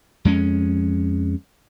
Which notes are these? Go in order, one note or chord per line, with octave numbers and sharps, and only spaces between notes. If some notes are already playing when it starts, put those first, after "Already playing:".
F2 G#3 C#4